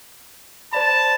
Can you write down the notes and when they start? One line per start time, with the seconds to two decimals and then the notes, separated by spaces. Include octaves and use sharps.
0.73 C5 D5 A5 B5